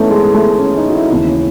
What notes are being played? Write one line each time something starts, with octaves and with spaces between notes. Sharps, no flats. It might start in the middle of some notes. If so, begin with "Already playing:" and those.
Already playing: G#2 E3 A3 B3 C#4 D#4
G#3
A3
C#4
D#4
F#4
E4
D#2 C#3 E3 E4
C#4